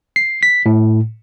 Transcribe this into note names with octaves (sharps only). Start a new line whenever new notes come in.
C7
B6
A2